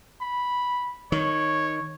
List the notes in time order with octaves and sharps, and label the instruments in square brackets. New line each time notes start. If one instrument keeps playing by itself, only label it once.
[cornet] B5
[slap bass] D#3 [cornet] C#5